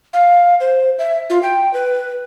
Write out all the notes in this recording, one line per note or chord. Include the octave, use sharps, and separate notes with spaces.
F5
C5
E5
F4
G5
B4